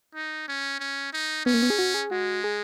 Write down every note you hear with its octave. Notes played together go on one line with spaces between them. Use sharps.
D#4
C#4
C#4
D#4
B3 C#4
A#3
B3
G#4
F#4
G#4
G#3 F#4
G#4